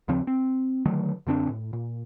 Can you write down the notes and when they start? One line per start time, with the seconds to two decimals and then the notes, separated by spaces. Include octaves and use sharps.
0.08 D#2 C#3 F3 C4
0.27 C4
0.86 D3 D#3 F#3 A3
1.27 F#2 D3 C4 D4
1.49 A2
1.73 A#2